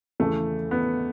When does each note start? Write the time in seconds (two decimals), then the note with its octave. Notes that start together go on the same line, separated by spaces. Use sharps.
0.20 E2 C#3 E3 A3
0.71 B3